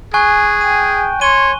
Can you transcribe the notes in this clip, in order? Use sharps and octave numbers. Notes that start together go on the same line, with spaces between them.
G#4 G#5 C#6 F#6
G5 D#7
C#5 C6 D#7 G7